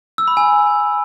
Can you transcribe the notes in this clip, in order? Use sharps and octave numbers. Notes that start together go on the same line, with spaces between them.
E6
B5
G#5